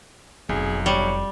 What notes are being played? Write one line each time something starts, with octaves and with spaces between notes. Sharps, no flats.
F1 B1 G#4
G3 C#5